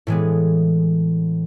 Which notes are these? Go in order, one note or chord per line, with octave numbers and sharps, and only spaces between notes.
A2 E3 G#3 B3